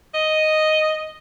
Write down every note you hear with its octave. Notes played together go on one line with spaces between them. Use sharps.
D#5